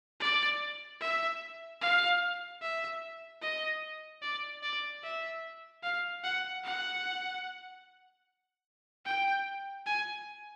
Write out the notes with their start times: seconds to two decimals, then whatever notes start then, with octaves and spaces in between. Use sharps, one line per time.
0.21 D5
1.01 E5
1.82 F5
2.62 E5
3.42 D#5
4.22 D5
4.63 D5
5.04 E5
5.84 F5
6.24 F#5
6.64 F#5
9.05 G5
9.86 G#5